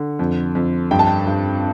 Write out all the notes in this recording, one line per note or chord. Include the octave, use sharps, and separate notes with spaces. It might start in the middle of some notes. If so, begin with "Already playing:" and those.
Already playing: D3
F2
F2
G2 G5
A5
G5
G2